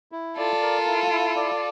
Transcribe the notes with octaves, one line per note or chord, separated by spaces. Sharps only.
E4
F4 A4 D5
A#4
E4
E4
D5